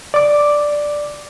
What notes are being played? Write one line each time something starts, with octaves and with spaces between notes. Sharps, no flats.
D5 D6